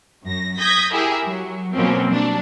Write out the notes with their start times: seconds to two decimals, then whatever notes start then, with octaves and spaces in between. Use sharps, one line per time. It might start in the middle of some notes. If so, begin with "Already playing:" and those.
0.23 F#2 A#6
0.59 D#6 G6 G#6 A#6 B6
0.93 E4 G4 G#4 A#4 E5
1.25 F#3
1.75 B2 F3 F#3 A#3 C4 C#4
2.08 F#3 G3 D4